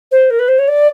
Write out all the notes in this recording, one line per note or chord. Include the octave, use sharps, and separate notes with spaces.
C5
A#4
B4
C5
C#5
D5